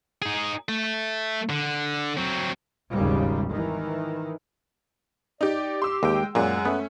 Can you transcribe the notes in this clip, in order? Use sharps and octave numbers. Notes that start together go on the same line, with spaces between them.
D#4 G#4
A3
D3
F#3 C4
G#1 D#2 C#3 G3
D#3 E3
D#4 G4 D5
G4 C6 E6
D#2 G#3 G5
F#2 A#2 G#3 F#5
A3 B3 C#4